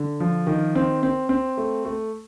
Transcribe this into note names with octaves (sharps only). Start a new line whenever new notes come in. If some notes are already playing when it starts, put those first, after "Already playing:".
Already playing: D3
F3
D#3
C4
C4
C4
A3
A3